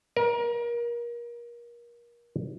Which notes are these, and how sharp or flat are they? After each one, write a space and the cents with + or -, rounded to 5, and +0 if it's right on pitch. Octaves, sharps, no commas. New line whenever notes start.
A#4 +30